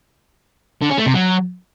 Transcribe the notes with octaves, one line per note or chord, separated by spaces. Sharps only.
D3
C#4
A3
C3
F#3